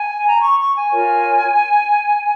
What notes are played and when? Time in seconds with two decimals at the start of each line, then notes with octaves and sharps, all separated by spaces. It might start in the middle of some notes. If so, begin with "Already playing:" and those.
Already playing: G#5
0.25 A#5
0.41 C#6
0.59 C#6
0.76 G#5
0.92 F4 A#4 C#5